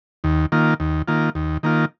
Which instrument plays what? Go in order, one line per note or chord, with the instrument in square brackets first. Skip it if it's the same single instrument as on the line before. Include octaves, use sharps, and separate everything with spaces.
[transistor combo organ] D#2
D#3 A#3 F4
D#2
D#3 A#3 F4
D#2
D#3 A#3 F4